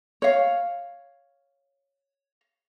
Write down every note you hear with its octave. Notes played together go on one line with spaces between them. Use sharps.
C#5 F5